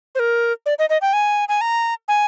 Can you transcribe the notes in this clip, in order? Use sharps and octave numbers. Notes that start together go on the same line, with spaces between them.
C5
A#4
D5
D#5
D#5
G5
G#5
G#5
A#5
G#5